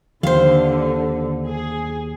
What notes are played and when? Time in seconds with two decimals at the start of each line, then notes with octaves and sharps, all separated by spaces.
0.23 D#2 D3 C5 F5
1.46 G#4